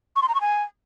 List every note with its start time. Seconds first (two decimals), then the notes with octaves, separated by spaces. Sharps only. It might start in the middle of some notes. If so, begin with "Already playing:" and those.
0.16 C#6
0.22 C6
0.28 A#5
0.35 C#6
0.41 G#5